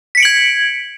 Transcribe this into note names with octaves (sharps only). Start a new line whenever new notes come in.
G#6 B6 C#7 D7 F#7